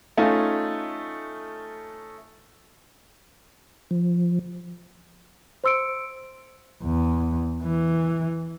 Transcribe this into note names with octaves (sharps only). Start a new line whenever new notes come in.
A3 C#4 D#4 F4 G#5
F3
C5 C6 E6 C#7 D7
E2
E3